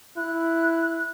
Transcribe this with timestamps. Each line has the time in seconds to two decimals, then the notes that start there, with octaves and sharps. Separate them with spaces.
0.17 E4 F#6